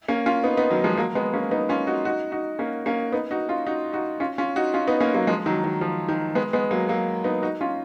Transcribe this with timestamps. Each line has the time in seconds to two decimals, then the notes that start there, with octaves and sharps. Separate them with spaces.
0.08 A#3 C#4
0.26 C#4 F4
0.43 B3 D#4
0.57 B3 D#4
0.70 D#3 F#3
0.84 F3 G#3
0.98 F#3 A#3
1.15 G#3 B3
1.34 A#3 C#4
1.51 B3 D#4
1.69 C#4 F4
1.87 D#4 F#4
2.05 D#4 F#4
2.32 D#4 F#4
2.59 A#3 C#4
2.86 A#3 C#4
3.12 B3 D#4
3.31 D#4 F#4
3.49 C#4 F4
3.67 D#4 F#4
3.93 D#4 F#4
4.20 C#4 F4
4.38 C#4 F4
4.56 D#4 F#4
4.74 C#4 F4
4.87 B3 D#4
5.00 A#3 C#4
5.14 F#3 A#3
5.27 F3 G#3
5.46 D#3 F#3
5.64 D#3
5.81 F3
6.08 D#3
6.35 G#3 B3
6.53 G#3 B3
6.71 F#3 A#3
6.89 F#3 A#3
7.24 B3 D#4
7.42 D#4 F#4
7.61 C#4 F4